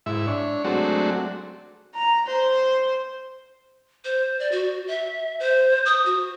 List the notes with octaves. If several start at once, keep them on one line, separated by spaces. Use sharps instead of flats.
G#2 E4 E5
D4 C#5
F#3 G#3 A3 C4 D4 F#4
A#5
C5
C5
D5
F#4
E5
C5
D#6
F#4